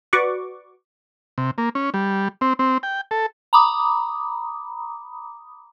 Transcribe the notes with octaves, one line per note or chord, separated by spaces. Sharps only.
F#4 B4 D5 F#5 C#6 D6
C3
A#3
C#4
G3
C4
C4
G5
A4
A#5 B5 D6 D#6